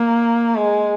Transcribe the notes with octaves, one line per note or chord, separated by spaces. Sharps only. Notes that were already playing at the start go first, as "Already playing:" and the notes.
Already playing: A#3
G#3